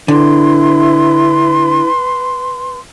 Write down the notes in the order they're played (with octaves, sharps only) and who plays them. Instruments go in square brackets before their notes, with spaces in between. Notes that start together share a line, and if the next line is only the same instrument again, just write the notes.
[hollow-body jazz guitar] D3 [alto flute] E4 [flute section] B4 C6